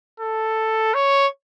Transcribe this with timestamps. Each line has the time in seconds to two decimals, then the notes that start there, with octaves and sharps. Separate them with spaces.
0.20 A4
0.94 C#5